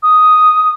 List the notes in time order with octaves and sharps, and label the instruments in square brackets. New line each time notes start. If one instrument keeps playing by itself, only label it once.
[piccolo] D#6